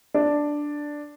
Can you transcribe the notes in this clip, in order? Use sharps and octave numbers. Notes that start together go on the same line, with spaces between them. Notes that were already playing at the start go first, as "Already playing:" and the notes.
D4